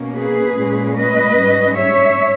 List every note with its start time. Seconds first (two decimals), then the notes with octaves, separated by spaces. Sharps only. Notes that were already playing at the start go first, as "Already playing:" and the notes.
Already playing: B2 A#3 C#4
0.16 G#4 B4
0.57 A#2 G#3 C#4
0.97 B4 D#5
1.37 G#2 G3 C#4
1.78 C#5 E5